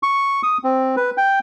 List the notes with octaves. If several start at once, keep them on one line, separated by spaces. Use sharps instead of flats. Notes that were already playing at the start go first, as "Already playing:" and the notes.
C#6
D#6
C4
B4
G5